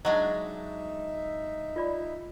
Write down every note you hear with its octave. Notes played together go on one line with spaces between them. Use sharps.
F#3 G#3 D4 D#4 D#5 E5
F4 D5 B5